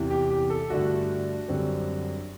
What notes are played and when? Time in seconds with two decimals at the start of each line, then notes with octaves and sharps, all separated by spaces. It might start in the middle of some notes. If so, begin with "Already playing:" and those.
Already playing: E2 C3 E3
0.10 G4
0.30 G4
0.50 A4
0.70 G2 D3 A3 D4 F#4
1.49 F#2 D3 G3 C4